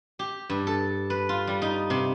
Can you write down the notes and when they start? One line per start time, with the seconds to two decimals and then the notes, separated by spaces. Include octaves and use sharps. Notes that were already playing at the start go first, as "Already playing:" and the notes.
0.19 G4
0.50 G2
0.67 A4
1.10 B4
1.29 F4
1.47 G3
1.62 D#4
1.90 C3